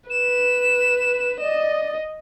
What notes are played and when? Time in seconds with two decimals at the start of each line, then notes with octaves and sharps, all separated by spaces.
0.10 B4 E7
1.40 D5 D#5